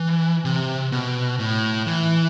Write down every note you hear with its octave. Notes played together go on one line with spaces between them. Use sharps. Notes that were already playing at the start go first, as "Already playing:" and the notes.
Already playing: E3
C3
B2
A2
E3